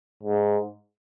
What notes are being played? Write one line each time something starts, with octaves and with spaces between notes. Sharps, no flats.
G#2